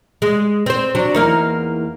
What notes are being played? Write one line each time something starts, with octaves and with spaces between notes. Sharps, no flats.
G#3
C4 C5
F#3 D4
E2 A#3 D#4